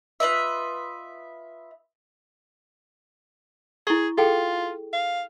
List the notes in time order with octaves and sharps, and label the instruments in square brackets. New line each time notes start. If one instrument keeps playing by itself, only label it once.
[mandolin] F4 B4 D#5 E5
[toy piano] E4 C#6 [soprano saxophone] G#4
[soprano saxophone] F4 [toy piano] G#4 A4 G5
[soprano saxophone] F5